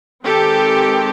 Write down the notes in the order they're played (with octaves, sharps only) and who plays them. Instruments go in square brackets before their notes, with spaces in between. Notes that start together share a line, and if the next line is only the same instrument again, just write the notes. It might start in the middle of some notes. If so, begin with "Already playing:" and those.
[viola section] D#3 G#3 C4 G4 A4